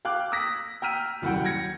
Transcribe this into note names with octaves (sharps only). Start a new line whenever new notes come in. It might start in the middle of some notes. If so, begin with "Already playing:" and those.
F5 G5 D6 F#6
D#6 E6 A#6 B6
G5 A#5 E6 F6 B6 D#7
D#1 C2 F#2 F#4 F#5 G5
G#6 A#6 C#7